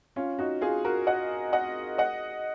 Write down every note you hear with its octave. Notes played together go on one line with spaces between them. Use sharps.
C#4 F4
D#4 F#4
F4 G#4
F#4 A#4
D#5 F#5
D#5 F#5
D#5 F#5